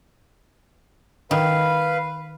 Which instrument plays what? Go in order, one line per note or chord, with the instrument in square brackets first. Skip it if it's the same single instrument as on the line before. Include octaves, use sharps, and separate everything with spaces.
[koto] D#3 [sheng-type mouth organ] B4 F5